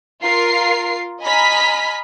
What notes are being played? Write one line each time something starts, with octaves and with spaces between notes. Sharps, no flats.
F4 A#4 C7
D#5 G#5 A#5 B5 F6 B6